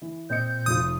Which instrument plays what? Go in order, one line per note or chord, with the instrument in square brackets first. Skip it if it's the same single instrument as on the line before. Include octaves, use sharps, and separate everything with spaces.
[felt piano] E3
[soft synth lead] A#2 [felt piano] C4 D#5 C#7 [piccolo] G6
[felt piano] F1 F3 F4 [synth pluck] D#6